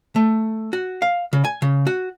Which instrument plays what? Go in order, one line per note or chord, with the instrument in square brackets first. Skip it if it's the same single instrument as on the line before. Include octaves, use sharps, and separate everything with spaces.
[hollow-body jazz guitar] A3
F#4
F5
C#3
G#5
C#3
F#4